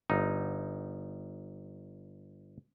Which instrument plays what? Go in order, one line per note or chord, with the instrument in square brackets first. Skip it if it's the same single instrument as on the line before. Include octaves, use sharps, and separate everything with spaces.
[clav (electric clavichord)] G1 D#4